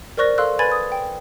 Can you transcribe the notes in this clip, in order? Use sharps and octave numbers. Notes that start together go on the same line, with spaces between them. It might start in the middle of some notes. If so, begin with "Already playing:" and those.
A#4 C5 D5 C#6 F#6 A#6
A4 F5 C6 E6 F#6
B4 G#5 B5 G#6 A6
D#6
G5